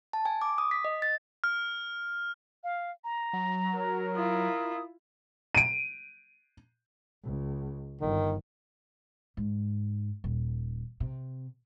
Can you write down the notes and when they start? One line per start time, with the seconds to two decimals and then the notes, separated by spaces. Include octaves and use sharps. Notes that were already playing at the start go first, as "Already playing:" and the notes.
0.13 A5
0.25 G#5
0.42 D6
0.58 D#6
0.71 B6
0.84 D#5
1.02 A6
1.44 F6
2.64 F5
3.04 A#5
3.33 F#3
3.74 A#4
4.16 E4 F4 D#6
5.55 D7 D#7
7.24 C#2
8.01 G1 D#3
9.37 G#2
10.24 D#1
11.00 C3